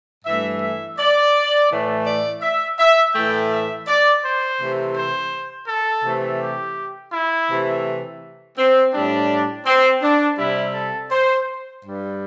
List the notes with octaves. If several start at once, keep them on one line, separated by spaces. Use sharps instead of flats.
G2 E3 A3 E5
E5
D5
A2 E3 A3
D5
E5
E5
A2 E3 A3 G5
E5
D5
C5
C3 E3 A3
C5
A4
C3 E3 A3
G4
E4
C3 E3 A3
C4
A2 G3 D4
C4
D4
C3 G3 E4
A4
C5
G2 G3